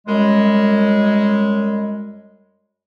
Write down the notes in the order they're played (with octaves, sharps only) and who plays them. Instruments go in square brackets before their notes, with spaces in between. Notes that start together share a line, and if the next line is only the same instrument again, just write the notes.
[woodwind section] F#2 G3 G#3